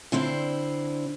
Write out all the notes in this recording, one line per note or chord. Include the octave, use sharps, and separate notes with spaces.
D3 C4 D4 E4 C5